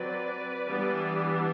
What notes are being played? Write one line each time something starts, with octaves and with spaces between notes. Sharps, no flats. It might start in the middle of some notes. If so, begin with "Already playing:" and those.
Already playing: F#3 C4 B4 D5
E3 G3 B3 D4